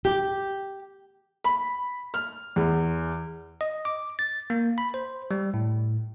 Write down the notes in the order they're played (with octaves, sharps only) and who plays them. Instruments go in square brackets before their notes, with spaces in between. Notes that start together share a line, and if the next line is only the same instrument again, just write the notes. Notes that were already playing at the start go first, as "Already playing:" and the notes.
[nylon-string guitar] G4
[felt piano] B5
F6
E2
[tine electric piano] D#5
D6
A6
A#3
B5
C5
G3
A2